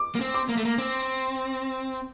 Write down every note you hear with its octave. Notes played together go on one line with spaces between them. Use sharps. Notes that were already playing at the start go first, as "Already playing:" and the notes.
Already playing: D6
A#3
C4
D6
A#3
A3
A#3
C4